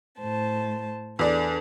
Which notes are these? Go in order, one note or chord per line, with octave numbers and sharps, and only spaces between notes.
A2 C5 A5
E2 D4 A4 D5